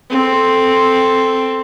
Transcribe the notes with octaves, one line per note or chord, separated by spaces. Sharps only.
C4 A4